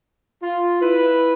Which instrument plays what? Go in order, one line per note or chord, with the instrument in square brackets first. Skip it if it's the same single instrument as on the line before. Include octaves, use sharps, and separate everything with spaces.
[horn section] F4
E4 B4